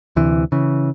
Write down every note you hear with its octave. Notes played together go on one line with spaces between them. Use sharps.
D2 C3 E3
C#3 E3